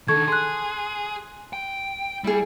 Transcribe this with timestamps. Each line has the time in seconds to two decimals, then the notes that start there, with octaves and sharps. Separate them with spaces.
0.08 D3 D#3 A4 C#6 G#6
0.28 G#4 C6 F#6
1.53 G5
2.24 G3 E4 G#4